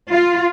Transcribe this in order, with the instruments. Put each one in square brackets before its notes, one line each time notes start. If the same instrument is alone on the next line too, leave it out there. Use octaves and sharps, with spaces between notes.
[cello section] F4